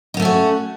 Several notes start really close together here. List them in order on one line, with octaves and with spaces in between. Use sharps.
D#4 B3 A3 C#4 F#4